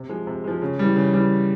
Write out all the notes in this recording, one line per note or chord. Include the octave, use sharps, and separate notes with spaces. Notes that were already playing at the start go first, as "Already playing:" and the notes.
Already playing: C3
F3 G#3
C3
F3 G#3
C#3
E3 G3
C#3
E3 G3